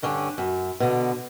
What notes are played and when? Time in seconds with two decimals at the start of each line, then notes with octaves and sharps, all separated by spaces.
0.03 G2 D3 C#4 D4
0.38 F#2
0.80 B2 D3